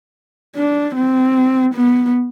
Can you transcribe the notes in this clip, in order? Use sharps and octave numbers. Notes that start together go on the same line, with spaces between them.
D4
C4
B3